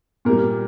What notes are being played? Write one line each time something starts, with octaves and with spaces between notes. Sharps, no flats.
A#2 G3 A#4